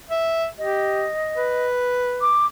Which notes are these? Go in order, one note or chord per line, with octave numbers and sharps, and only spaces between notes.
E5
G4 D#5
B4
D6